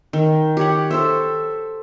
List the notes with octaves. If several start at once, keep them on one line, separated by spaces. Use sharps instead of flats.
D#3
G4 C#5 F#5
A4 C5 E5